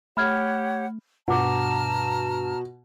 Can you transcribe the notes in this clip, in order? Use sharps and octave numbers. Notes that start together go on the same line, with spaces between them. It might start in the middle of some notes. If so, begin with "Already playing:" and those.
A3 G4 C#5 F#5 B5 F6 G#6
G2 B2 F#4 F#5 A5 A#5 D6 F6